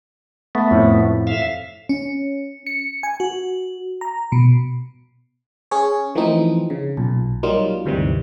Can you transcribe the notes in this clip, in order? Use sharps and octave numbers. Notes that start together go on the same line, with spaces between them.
A3 B3
F2 A2
E5 F5
C#4
C#7
G#5
F#4
A#5
B2
C#4 G#4 C#5
E3 F3 A3 A#3 C4 D#4
C#3
B1 A#2
F#3 G3 A#3 D#4 F4
D2 G2 C3 D#3 E3 G3